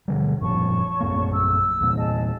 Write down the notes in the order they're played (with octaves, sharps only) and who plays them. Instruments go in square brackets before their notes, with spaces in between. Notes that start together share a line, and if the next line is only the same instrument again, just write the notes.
[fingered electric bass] B2 D3 G3
[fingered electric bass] F#1 A#2 F3 [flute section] C#5 A5 C#6
[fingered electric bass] A#1 F#2 A#3
[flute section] E6
[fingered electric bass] E2 A#2
[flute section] G#4 D#5 A5